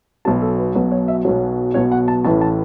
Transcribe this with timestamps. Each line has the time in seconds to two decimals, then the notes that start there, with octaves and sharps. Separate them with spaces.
0.25 B1 B2 F#3 A5
0.42 A4
0.58 B4
0.75 B1 B2 F#3 B4
0.91 C#5
1.08 E5
1.25 B1 B2 F#3 C#5
1.74 B1 B2 F#3 C#5
1.92 F#5
2.08 A5
2.24 A1 A2 E3 A5
2.41 A5